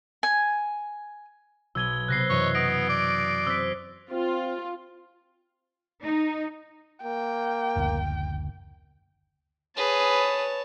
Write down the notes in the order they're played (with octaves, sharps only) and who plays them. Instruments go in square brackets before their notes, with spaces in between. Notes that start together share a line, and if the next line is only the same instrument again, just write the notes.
[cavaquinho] G#5
[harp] B1 D#6 [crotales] E6 G#6 G7
[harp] C3 B3 [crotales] F#6 A#6 C7
[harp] F#2 E3 D#5 [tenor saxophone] C#5
[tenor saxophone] B3 [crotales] D#6 A#6 D7
[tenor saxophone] D5
[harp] C4 [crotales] E6 F#6 B6
[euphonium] C4 [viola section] F4
[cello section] D#4
[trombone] A#3 [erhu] G5
[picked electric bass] F#1 D2
[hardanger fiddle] G#4 B4 [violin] C#5 A5